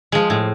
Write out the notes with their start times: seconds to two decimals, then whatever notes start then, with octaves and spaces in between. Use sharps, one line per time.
0.12 F3 G#3
0.30 A2